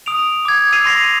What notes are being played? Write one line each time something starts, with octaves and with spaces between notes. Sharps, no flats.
D#6 D7 F7
D6 G#6
E6 G#6 A6 C7 D#7 F7
C6 A#6 C7 F7